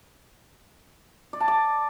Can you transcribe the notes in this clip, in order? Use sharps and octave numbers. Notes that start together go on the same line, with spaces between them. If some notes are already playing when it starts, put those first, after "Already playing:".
D5
A5
D6